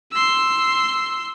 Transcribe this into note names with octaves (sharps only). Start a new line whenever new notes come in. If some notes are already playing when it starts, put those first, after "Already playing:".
C6 E6